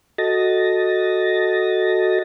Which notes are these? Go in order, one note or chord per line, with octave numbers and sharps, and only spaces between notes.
F#4 A4 D#5 A6 A#6